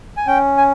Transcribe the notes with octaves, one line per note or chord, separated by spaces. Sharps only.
G#5
C#4 G5
G#5